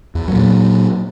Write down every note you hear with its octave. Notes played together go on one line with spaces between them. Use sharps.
E2
A#2 F#3